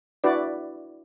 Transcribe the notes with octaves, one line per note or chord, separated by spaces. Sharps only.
D4 E4 F#4 B4 D5